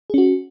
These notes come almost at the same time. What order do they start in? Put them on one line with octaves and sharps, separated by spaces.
G#4 C#4 F#4